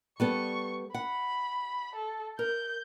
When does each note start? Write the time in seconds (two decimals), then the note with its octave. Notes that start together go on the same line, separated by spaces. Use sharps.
0.20 G3 B3 A4 C#6
0.94 F#5 B5
1.95 A4
2.39 A#4 G6